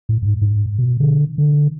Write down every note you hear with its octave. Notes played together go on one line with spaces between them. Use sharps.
A2
G#2
G#2
B2
D3
D3